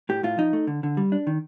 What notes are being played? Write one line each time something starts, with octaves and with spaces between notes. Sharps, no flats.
A2 G4
A2 F4
F3 D#4
A3
D3
D3
G3
D4
D#3